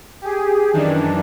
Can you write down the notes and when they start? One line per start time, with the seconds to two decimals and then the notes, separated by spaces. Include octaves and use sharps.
0.21 G4 G#4
0.73 F#2 D#3 E3 D4